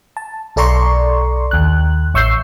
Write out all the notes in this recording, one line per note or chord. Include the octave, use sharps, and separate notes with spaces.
A5
B1 A4 D5 A#5 C6 C#6
D#2 F#6
A1 C#6 E6 G6 C7